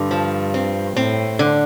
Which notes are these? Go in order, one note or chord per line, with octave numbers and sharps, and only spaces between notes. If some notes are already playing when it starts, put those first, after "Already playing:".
Already playing: G2 D3
F3
C4
A2 C4
D3